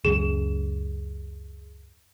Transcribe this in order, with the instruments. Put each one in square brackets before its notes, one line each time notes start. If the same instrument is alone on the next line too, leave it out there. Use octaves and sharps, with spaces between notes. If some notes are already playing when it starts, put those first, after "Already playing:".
[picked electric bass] C#2 F#2 [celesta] G#4 E7